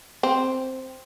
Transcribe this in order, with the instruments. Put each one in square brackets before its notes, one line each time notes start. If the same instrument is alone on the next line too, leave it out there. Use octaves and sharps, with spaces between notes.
[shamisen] C4